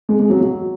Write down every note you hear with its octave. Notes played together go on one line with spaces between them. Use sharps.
G#3
G#3
F#3
F#3